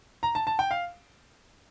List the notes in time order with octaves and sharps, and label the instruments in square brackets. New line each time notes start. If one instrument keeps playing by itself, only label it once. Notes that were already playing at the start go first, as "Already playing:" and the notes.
[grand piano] A#5
A5
A5
G5
F5